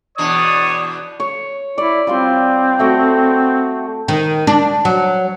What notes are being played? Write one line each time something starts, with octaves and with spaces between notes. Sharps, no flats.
E2 B2 D4 C#5 D5 D#6
C#5
E4 D5
G3 C4 F4 C6
A3 F#4 G5
D#3
D4
F#3